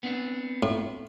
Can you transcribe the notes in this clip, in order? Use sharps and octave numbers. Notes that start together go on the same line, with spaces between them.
B3 C4 D4
A2